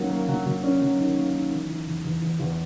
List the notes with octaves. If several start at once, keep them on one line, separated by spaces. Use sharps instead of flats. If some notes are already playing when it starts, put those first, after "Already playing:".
Already playing: D#3 F#3 A#3 C#4
A#3
F#3
F#3
C#4
F#3
D#3
A#3
D#3
E3
E3
E2
E2
E2
E2